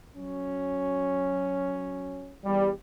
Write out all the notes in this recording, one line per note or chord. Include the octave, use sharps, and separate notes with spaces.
F#3 C#4
E2 G3